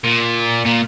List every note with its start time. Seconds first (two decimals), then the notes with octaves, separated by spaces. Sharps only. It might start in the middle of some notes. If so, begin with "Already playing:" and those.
0.04 A#2
0.66 A#2